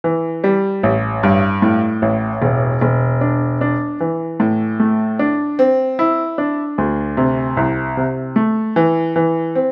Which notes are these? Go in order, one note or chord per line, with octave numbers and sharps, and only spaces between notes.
E3
G3
A1
G2
A2
A1
E1
E1
D4
D4
E3
A2
A3
D4
C4
E4
D4
D2
C3
C2
C3
A3
E3
E3
C4